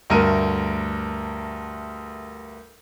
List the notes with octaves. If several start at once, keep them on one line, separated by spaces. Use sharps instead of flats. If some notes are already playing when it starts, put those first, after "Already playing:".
D2 G2 A3 A#4 D#7